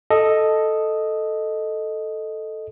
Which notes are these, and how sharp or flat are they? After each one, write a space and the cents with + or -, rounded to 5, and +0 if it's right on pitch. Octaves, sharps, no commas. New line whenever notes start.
A4 +0 D#5 +0